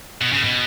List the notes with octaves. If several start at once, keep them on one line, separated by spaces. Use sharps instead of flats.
B2
C#3
B2